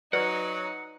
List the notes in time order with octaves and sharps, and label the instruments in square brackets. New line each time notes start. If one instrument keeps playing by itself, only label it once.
[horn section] F#3 [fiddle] D#4 [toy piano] B4 D5 [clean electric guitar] F#5